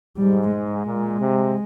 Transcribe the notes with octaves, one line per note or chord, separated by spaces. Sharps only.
G#2 G3
G#3
A#2
C3